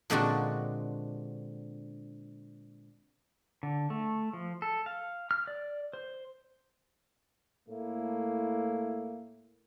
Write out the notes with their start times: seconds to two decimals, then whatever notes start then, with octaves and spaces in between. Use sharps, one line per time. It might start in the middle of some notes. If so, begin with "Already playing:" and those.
0.10 A#2 D3 G#3 C4 D4 F#4
3.63 D3
3.90 A3
4.33 F3
4.62 A4
4.86 F5
5.31 F6
5.48 D5
5.93 C5
7.69 A2 A3 A#3 E4